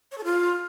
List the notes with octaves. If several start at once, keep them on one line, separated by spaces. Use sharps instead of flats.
C#5
A4
F4